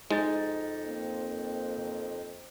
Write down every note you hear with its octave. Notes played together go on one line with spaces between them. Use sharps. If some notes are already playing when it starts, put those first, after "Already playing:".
F2 G#3 D#4 A6
A#3 C4